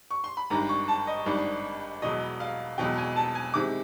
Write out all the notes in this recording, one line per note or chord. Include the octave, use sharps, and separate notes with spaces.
C#6
C6
B5
G#1 G2 D#3 A#5
C#6
A5
D#5
G#1 G2 D#3 D5
E1 E2 B2 F#3 D#5
F5
E1 E2 B2 F#3 G5
G#5
A5
G#5
E2 C3 D#3 G#3 D6